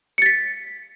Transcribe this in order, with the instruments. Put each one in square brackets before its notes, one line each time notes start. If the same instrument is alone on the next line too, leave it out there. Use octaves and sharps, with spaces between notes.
[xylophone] C#7
A6
B6